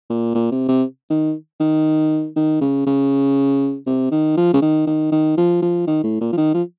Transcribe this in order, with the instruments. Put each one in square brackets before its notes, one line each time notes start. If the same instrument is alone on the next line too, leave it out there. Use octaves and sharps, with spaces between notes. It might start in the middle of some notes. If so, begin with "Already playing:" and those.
[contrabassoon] A#2
A#2
C3
C3
D#3
D#3
D#3
C#3
C#3
C3
D#3
F3
C#3
D#3
D#3
D#3
F3
F3
D#3
A2
A#2
F3
D#3
F3